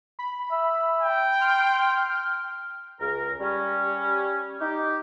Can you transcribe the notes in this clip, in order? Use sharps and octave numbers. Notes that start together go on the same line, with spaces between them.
B5
E5
G5
C6 F6
C#2 A#4
G3 C#4
D#4 G4